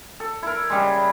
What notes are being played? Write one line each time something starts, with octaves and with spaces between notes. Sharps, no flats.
A4
E4 A#4
C#3 G3 G#3